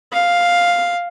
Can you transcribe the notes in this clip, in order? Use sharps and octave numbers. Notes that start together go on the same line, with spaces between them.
F5